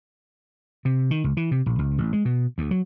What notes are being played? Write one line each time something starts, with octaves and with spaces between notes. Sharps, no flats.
C3
D#3
C#2
E3
C3
A#1
C#2
A1
G#3
B2
D2
F#3